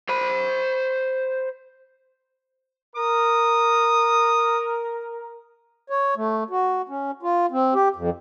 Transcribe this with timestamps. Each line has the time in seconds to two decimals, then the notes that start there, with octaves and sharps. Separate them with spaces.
0.09 C5 B5
2.96 A#4 D#6
5.90 C#5
6.17 A3
6.51 F#4
6.89 C#4
7.23 F4
7.51 C4
7.74 G4
7.96 F2